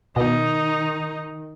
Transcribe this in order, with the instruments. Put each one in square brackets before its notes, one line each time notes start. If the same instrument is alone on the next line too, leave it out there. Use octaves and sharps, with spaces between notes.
[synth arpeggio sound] B2 [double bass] D#3 [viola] D#4